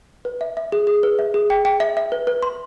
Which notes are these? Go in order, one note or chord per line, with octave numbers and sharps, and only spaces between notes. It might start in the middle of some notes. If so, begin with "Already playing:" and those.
B4
E5
E5
G#4
G#4
B4
E5
G#4
G5
G5
E5
E5
B4
B4
C6